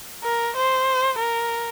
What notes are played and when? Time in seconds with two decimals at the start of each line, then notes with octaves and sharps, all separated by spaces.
0.23 A#4
0.56 C5
1.19 A#4